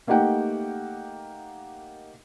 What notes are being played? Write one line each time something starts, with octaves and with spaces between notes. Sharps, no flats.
A3 A#3 D#4 G4 F#5 G5